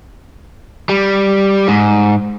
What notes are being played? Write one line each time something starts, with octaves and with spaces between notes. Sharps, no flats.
G3
G#2